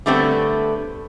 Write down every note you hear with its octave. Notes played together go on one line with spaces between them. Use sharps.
D3 G3 A3 B3 C4